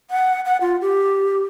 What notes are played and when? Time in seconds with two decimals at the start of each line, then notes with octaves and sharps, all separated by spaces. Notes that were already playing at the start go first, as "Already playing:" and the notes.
0.10 F#5
0.45 F#5
0.61 F4
0.81 G4